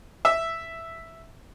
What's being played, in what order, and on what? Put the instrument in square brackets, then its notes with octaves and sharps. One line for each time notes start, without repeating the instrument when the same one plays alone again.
[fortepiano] E5